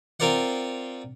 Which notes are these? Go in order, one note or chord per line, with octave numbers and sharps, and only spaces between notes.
C4 F4 A#4 C5 D5 F#5